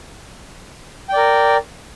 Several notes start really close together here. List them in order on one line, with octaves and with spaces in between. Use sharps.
G5 D5 A#4